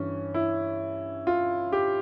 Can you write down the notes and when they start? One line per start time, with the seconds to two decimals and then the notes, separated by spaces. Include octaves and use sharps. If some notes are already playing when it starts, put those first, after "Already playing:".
Already playing: G2 E3 C#4
0.34 E4
1.27 F4
1.72 G4